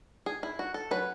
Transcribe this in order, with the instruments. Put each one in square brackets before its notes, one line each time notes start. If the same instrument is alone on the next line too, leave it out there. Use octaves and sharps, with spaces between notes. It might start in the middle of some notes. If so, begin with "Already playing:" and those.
[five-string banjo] G#4
E4
F#4
A4
F#3 C#4 B4